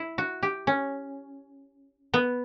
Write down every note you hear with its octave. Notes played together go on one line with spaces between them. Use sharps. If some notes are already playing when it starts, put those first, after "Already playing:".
Already playing: E4
F#4
G4
C#4
B3